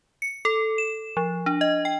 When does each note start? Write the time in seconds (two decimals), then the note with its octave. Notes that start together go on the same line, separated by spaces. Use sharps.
0.22 C#7
0.45 A4
0.78 E7
1.17 F3
1.46 D4
1.61 D#5
1.85 G5